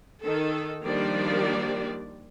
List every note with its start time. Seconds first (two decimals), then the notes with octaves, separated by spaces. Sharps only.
0.23 D#3 A4
0.83 D#3 F3 G3 A#3 D4 D5